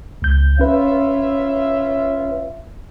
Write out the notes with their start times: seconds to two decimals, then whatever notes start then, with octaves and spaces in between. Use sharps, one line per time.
0.22 C#2 G6
0.60 C#4 F4 B4 C#5 E5